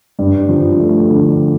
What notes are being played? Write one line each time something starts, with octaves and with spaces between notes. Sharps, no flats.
G2
F3
A3
D3